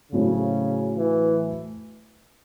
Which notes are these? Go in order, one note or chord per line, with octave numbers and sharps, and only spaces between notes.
A2 C#3 F#3 A3 C4 E4
E3